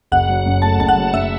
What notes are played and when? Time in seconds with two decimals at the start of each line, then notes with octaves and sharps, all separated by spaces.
0.12 F#1 F#5
0.29 F#3
0.46 F#2
0.62 A3 A5
0.79 F#1 A5
0.89 F#5
0.96 F#3
1.13 F#2 E5